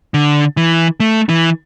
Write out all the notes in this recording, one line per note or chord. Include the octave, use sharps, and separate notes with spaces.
D3
E3
A3
E3